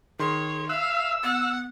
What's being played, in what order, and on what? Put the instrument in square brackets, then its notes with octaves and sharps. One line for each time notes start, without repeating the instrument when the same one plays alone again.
[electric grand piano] D#3 C6 C7 [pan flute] G#4 [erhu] C#5
[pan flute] E5 [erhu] F5 [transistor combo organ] E6 [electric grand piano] F#6
[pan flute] B3 [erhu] F#5